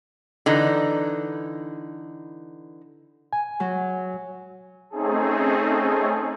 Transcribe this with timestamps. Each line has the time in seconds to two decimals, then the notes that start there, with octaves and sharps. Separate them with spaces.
0.46 D3 E3 D#4
3.33 G#5
3.60 F#3
4.90 A3 C4 C#4 D#4 G#4 A4